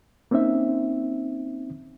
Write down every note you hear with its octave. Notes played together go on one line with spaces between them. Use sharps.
A#3 C4 C#4 D#4 E5